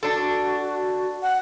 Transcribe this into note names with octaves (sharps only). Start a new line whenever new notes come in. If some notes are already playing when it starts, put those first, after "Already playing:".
D4 F#4 A4
F#5